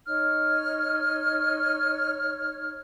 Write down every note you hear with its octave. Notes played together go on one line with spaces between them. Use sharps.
D#4 C#5 F6